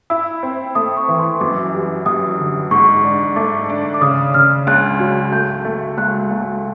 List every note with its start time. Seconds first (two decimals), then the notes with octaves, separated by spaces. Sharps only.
0.10 E4 E6
0.43 C4
0.75 A3 D#6
0.97 C#6
1.08 E3
1.19 C6
1.41 F#2 D6
1.74 G3
2.06 F#2 D#6
2.39 D3
2.71 G#2 C#6
3.04 D4
3.36 A3 D6
3.69 D4
3.94 D6
4.01 C#3 D#6
4.34 C#3 F6
4.67 C#2 F#6
5.00 F#3
5.32 A3 G6
5.65 A3
5.98 C#2 F#6
6.31 C#2